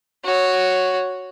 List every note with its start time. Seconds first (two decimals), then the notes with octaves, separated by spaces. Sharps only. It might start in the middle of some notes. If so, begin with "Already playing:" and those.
0.25 F#4 C#5